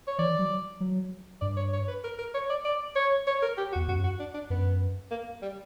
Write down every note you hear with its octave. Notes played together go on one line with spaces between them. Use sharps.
C#5
E3 D5
F#3
F#3
G2 D5
C#5
C#5
B4
A#4
A#4
C#5
D5
D5
C#5
C#5
A#4
G4
F#4
E2
F#2 F#4
F#4
D4
D4
F#2 B3
A#3
G3